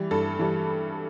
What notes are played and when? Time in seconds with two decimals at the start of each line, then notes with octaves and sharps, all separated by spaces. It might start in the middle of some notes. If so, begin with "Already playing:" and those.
Already playing: E3 G3
0.11 G2 A4
0.39 E3 G3